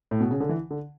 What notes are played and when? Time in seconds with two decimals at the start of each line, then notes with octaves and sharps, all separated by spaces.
0.11 A2
0.20 B2
0.31 C#3
0.40 D3
0.49 E3
0.71 D3